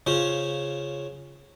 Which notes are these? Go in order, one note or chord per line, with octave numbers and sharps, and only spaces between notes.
C#3 F4 C5 C#5